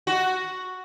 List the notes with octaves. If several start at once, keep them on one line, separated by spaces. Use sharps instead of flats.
F#4